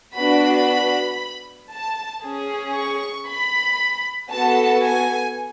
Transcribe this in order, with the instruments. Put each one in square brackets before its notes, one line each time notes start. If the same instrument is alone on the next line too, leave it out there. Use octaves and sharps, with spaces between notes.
[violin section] B3 D4 F#4 B5
A5
C#4 G#4
C#6
B5
B3 F#4 A4 A5
G#5